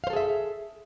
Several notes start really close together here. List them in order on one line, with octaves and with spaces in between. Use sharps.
F5 C5 A4 G#4 E5